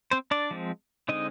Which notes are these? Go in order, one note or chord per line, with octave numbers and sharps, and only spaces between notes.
C4 C5
D4 D5
F3 G#3 C4
D3 G#3 C4 D#4 D#5